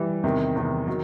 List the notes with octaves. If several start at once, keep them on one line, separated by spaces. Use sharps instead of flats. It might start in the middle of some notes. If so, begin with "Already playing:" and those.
Already playing: E3 G3
E2 C3 D#3
E2 C3 D#3
D#3 F#3